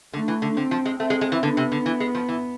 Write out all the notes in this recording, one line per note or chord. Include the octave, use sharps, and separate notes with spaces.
D3 A3
E3
D3
D3 C4
F3
G#3
A3 C4
G#3
G#3
E3
D3 B3
C3
D3
E3
G#3
F3
E3